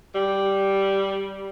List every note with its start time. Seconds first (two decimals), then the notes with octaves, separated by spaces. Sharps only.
0.14 G3